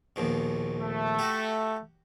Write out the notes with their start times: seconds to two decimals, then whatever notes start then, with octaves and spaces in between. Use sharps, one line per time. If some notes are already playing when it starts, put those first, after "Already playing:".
0.16 A#1 D#2 B2
0.79 A3
1.19 F#4 G4